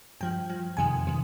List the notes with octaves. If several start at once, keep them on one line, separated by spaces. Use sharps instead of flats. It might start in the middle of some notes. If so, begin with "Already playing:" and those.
G2 F3 G5
G2 F3
F2 C3 D#3 G#5
C3 D#3